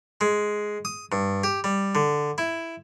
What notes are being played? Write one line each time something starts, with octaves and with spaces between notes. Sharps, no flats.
G#3
D#6
G2
G4
G3
D3
E4